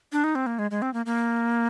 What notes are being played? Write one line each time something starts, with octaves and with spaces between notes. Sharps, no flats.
D4
D#4
C4
A#3
G#3
G#3
C4
A#3
A#3